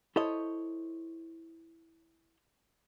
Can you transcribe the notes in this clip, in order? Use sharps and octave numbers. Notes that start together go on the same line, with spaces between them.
E4 A4 C5 C#5 D#5